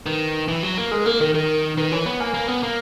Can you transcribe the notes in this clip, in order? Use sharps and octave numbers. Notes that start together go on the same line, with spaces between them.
D#3 B4
E3
F#3
A#3
G#3 A#4
A#3 A#4
D#3 A#4
D#3 A#4
D#3 B4
E3 C#5
B3 C#5
A#3 G#5
A#3 B5
B3 B5
A#3